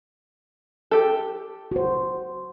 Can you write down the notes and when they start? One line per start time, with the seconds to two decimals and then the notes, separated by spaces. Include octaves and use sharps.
0.91 G4 A4
1.72 F#4 C5